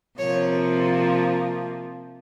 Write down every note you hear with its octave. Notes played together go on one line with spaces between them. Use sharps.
C3 F3 A#3 C#5